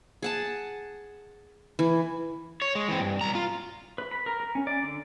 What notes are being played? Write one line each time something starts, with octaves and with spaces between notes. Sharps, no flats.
G#4 F#5 A5
E3
C#5
G#3
E3 C4
G2
B1 A#5
F4
B4
B5
A#4
A#4
C#4
D5
D3